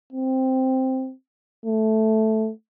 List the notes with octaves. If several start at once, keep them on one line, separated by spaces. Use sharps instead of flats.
C4
A3